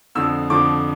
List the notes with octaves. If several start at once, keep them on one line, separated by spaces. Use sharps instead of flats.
F2 D3 F3 E6
F2 D3 F3 D6